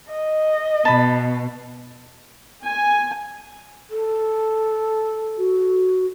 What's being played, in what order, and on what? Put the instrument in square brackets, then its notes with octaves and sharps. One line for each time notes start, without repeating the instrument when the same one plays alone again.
[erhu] D#5
[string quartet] B2 [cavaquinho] A5 B5
[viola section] G#5
[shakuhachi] A4
[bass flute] F#4